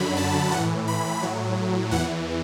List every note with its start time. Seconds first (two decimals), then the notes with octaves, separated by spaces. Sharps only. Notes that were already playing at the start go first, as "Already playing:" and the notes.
Already playing: F#2 D3 F#3 B5
0.16 A5
0.51 A2 E3 F#5
0.88 B5
1.22 A2 F#3
1.91 E2 E3 F#5